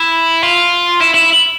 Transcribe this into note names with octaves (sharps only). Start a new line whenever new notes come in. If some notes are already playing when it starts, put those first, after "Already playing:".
Already playing: E4
F4
E4
E4